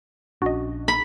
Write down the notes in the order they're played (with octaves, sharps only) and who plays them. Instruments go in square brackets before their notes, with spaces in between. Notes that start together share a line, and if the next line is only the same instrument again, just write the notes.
[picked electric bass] A#1 C#4 D4 [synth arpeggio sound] F#4 D#5
[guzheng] B5